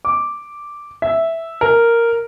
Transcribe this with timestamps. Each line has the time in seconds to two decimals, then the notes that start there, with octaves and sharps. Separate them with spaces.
0.05 D6
1.02 E5
1.61 A#4